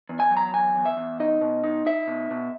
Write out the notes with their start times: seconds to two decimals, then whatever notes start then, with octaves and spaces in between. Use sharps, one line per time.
0.09 E2
0.20 G#5
0.30 F#3
0.37 A#5
0.53 E2 G#5
0.75 E2
0.86 E5
0.97 E2
1.20 D#4 D#5
1.41 B2
1.64 D#4
1.86 D#4 E5
2.07 B2
2.31 B2